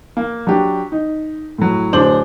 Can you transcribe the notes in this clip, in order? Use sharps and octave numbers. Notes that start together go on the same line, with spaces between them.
A#3
F#3 D4 G4
D#4
A2 F#3
D1 D4 C5 D6 F#7